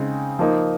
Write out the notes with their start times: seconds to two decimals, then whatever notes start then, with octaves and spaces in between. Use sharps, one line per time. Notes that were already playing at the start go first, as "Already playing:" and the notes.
Already playing: C#3 G#3 C4 D#4
0.39 F3 A#3 D#4